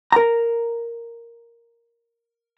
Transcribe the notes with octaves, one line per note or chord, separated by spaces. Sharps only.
A#4 A#5